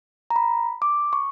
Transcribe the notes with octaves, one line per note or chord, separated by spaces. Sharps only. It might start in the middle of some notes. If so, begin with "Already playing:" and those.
A#5
B5
D6
C#6